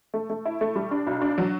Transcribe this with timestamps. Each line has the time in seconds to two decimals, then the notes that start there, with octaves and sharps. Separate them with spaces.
0.14 A3
0.30 A3
0.45 E4
0.61 A3
0.76 G3
0.91 D4
1.07 B1
1.22 D4
1.38 F#3